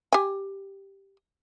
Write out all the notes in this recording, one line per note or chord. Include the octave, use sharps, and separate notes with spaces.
G4 G#5